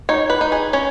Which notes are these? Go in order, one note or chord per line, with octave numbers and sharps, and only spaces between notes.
D#4 C#5
B4
D#4
G#4
C#4 C#5